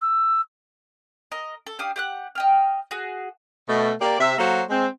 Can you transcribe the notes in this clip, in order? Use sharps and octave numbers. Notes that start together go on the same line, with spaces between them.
E6
A#4 D#5
A4
D4 G4 F5 D#6
G4 F#5 F#6
D#5 G5 F6
F#4 G#4
B2 A3
A#3 G4 A#4 D5
C3 E5
F#3 A#3 F#4 A4 C5
G#3 C4